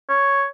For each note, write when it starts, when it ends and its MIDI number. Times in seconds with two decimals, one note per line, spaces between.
0.09 0.45 73